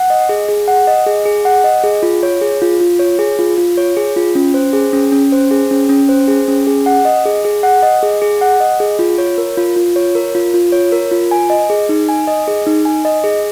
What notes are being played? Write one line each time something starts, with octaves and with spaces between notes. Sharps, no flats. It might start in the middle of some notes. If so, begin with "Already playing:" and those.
Already playing: F#5
D#5
G#4
G#4
F#5
D#5
G#4
G#4
F#5
D#5
G#4
F4
C#5
G#4
F4
F4
C#5
G#4
F4
F4
C#5
G#4
F4
C#4
C5
G#4
C#4
C#4
C5
G#4
C#4
C#4
C5
G#4
C#4
G#4
F#5
D#5
G#4
G#4
F#5
D#5
G#4
G#4
F#5
D#5
G#4
F4
C#5
A#4
F4
F4
C#5
A#4
F4
F4
C#5
A#4
F4
G#5
D#5
G#4
D#4
G#5
D#5
G#4
D#4
G#5
D#5
G#4